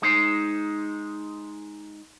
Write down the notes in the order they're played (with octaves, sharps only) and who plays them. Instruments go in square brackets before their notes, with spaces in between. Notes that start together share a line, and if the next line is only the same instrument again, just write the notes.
[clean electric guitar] G#3 D#4 C5